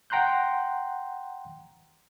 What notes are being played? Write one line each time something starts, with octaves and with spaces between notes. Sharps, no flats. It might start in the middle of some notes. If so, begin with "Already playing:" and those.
F#5 G5 A#5 C6 F#6 G6